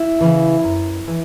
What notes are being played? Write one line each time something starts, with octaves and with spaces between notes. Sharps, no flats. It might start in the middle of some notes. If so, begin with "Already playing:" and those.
Already playing: E4 E5
C#3 E3
F#2
E3